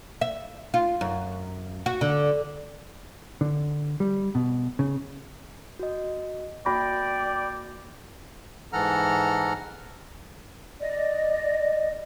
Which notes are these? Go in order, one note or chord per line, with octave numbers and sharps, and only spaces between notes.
E5
F4
F#2
F#4
D3
D3
G3
B2
C#3
F#4 D#5
A#3 F#4 D5 G5 B5 A#6
G#2 E3 A4 F#5 A#5 F6
D5 D#5